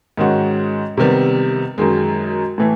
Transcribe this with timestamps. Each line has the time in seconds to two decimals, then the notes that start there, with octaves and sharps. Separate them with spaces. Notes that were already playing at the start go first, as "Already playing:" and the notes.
0.17 G#2 D#3 G#3 C#4 F#4
0.97 C3 D#3 G3 B3
1.78 F#2 D#3 G#3
2.58 A2 E3 A3